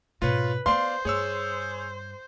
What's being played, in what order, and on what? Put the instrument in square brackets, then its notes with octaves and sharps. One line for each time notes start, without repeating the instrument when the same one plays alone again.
[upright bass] G#2 B2 [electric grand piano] F4 C#5 [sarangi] B4
[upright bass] B3 F4 [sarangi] C5 [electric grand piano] D5 F5 [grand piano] C6
[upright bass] G2 [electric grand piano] G#4 C#5 E6